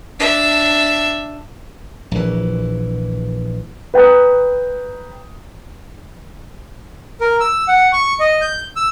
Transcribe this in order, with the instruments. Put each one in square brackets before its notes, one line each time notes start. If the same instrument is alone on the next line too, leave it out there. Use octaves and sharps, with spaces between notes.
[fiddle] D4 E5
[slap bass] A#1 E3
[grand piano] B4 G5 A#5 D#6
[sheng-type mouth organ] A#4
E6
F#5
C#6
D#5
G6
E6